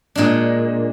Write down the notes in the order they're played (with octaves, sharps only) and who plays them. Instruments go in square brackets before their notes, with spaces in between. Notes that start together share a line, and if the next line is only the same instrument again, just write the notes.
[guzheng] A#2 G#3 D4